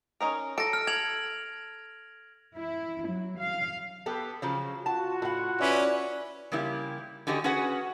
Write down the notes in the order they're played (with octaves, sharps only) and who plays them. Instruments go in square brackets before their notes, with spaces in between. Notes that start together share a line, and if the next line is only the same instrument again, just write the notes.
[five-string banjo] C#4 D#4 A#4
[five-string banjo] A4 [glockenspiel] A#6 D7
[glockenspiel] F6
[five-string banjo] A4 [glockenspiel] G#6 F7 F#7
[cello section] E4
F#3
F5
[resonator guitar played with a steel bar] B3 G4 A4
C#3 F3 F#3
[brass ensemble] F4 F#4 [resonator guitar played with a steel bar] A5
[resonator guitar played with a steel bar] A2 F#5
[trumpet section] C#4 E4 B4 [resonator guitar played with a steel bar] D5
[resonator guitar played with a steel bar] C#3 G3 A#3 E4 G4
D3 C#4 F#4 G4 D#5
C#4 F#4 G#4 B4 F#5